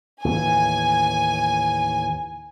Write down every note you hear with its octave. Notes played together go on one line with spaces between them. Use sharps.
D#2 A2 E3 G#5